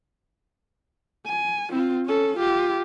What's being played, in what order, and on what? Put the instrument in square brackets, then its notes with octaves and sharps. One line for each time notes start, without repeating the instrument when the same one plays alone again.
[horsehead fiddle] G#5
C4 F4
C#4 A4
F4 G4